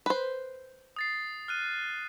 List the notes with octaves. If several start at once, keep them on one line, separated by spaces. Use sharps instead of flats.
B4 C5
D#6 A6 C7
F6 F#6 D#7